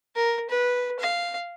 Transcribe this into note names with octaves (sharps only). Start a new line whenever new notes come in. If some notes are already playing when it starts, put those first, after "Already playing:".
A#4
B4
F5